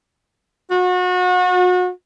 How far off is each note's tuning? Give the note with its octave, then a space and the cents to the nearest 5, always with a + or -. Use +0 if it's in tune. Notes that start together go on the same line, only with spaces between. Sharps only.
F#4 -35